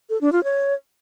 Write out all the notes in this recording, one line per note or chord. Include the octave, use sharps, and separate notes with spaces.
A4
D4
F4
C#5